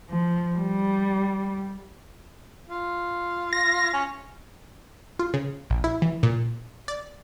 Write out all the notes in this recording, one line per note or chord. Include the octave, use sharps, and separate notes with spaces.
F3
G3
F4
A#6
C#4
F4
C#3
A#1
E4
E3
A#2
D5